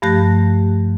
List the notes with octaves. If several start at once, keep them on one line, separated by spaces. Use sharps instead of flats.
G2 F3 A3 G4 F#6 A#6